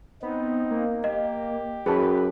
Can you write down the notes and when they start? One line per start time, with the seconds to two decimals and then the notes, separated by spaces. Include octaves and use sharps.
0.23 B3 C4 D#4
0.71 A#3
1.04 G4 D#5
1.86 F#2 G#4 B4 A5